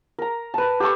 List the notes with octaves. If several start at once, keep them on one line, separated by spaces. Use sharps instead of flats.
A#4 A#5
B4 A5
G4 A4 C#6